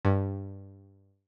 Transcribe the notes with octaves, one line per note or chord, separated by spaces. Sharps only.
G2